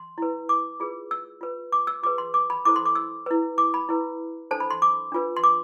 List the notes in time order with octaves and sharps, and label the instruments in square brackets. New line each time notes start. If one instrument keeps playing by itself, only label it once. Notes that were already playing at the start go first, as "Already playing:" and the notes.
Already playing: [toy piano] C6
E4 B4
D6
F4 G#4 B4
E6
F4 B4
D6
E6
F4 G#4 B4 D6
C6
D6
B5
E4 A4 C5 D6
C6
D6
E6
E4 B4
D6
B5
E4 B4
D4 A4 C5 A5
B5
C6
D6
D4 F4 B4
C6
D6